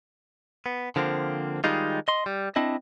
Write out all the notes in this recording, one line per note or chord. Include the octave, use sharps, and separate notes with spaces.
B3
D3 F3 A#3 C4
D#3 G3 G#3 D#4 F4
D#5 C6
G3
C4 D4 E4 D#5